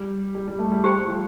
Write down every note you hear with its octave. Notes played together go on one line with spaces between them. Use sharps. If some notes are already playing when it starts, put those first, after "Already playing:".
Already playing: G3
G3
G3
A3
G3
G4 C5 G5 B5
G3
F3